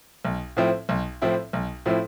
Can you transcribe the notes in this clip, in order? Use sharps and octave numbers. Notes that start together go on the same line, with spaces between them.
B1
A2 F3 C4 E4
B1
A2 F3 C4 E4
B1
A2 F3 C4 E4